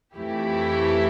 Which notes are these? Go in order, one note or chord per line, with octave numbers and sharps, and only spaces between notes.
F2 E3 A3 E4 G4